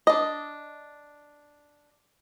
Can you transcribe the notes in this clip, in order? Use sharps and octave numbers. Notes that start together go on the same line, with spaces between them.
D4 D#5